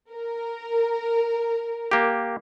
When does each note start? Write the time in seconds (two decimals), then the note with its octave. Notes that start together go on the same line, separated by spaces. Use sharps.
0.12 A#4
1.91 A#3 G4